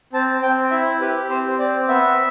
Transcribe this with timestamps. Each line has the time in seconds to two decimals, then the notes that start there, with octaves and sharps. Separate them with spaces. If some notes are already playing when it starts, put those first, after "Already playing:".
0.13 C4 A5
0.42 C4 G5
0.71 E4 E5
1.01 G4 B4
1.29 C4 C5
1.59 C4 D5
1.88 B3 E5